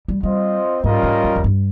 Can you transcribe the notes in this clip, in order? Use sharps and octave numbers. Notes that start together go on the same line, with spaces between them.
G3
G3 C4 F4 C5 D#5
G#2 G3 C#4 F4 A#4 D#5
G#2
F2
F2
G2